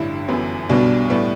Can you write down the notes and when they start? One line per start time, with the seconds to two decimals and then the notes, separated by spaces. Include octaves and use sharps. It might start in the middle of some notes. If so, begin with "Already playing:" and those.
Already playing: A1 G2 D3 E4
0.28 G1 F#2 E3 B3
0.69 B1 B2 G3 B3 D4
1.10 A2 G3 B3